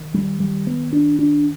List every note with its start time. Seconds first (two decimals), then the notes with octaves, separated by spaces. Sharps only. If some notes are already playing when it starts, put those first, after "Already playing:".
Already playing: D#3
0.14 G3
0.40 G3
0.67 B3
0.93 D4
1.19 D4